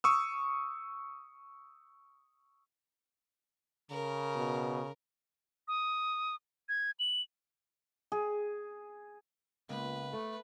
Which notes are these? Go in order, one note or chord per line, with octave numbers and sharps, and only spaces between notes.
C#6 D#6 E6
C#3 A#4
B2
D#6
G#6
F#7
G#4
C#2 A#3 B3 F4 B4
A3 A4